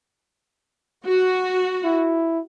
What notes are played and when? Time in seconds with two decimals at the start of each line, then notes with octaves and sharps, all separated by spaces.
1.06 F#4
1.84 E4